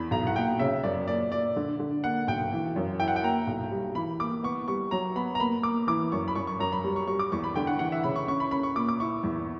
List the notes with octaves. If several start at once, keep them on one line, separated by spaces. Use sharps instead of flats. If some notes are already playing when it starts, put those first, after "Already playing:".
Already playing: E2 B5
B1 A#5
F#5
A#2 G5
C#3 E5
F#2 D5
A#2 D5
A#2 D5
D3
D3
A#3 F#5
B1 G5
E3
F#2
E4 G5
F#5
G5
A#3 A#5
B1
G3
E3 B5
A#3 D6
B3 C#6
G3 C#6
F#3 A#5
B3 B5
A#5
A#3 B5
A#3 D6
E3 D6
F#2 C#6
B5
F#2 C#6
C#6
F#2 A#5
B5
G3
C#6
G3 C#6
D6
E2 C#6
B5
D3 G5
F#5
E3 F#5
E5
C#3 B5
C#6
C#4 C#6
B5
C#4 B5
C#6
A#2 D6
D6
E4 C#6
E2